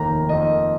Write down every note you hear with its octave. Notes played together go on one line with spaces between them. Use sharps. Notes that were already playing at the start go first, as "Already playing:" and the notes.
Already playing: F1 D#2 D#3 A#5
F2 D#3 A#3 D#5